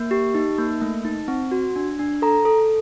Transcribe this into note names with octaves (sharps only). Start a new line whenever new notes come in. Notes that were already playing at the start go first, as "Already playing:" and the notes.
Already playing: A#3
G4
D#4
A#3
A3
D#4
C4
F#4
D4
D4
A4 A#5
A4